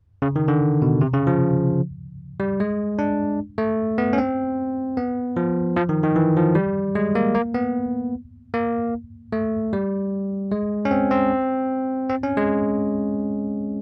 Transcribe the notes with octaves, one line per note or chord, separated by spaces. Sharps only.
C#3
D#3
D3
B2
C3
C#3
F3
G3
G#3
D4
A3
B3
C#4
C4
B3
F3
F3
D#3
D#3
E3
F3
G3
G#3
A#3
A#3
B3
A#3
A3
G3
G#3
C#4
C4
C4
C4
C#4
G#3